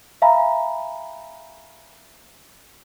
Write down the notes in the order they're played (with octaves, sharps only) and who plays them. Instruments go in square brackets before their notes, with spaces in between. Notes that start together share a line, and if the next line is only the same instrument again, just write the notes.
[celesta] E5 F5 G#5 A#5 B5